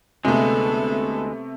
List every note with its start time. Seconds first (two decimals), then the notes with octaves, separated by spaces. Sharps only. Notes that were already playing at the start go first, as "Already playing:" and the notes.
0.25 D2 C3 G#3 A3 B3 A4